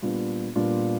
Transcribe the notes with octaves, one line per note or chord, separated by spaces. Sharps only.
A#2 G3 B3 D4 F4
A#2 G3 B3 D4 F4